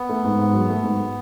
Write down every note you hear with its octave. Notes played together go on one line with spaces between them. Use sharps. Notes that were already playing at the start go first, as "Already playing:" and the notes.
Already playing: B3
A3
G#2
G#2
F#3
A3
G#2